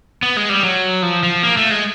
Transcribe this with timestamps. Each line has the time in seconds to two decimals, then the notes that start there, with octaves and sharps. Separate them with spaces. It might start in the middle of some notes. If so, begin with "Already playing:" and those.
0.23 B3
0.37 G#3
0.49 G3
0.63 F#3
1.02 F3
1.23 F3
1.43 A#3
1.57 A3
1.71 G#3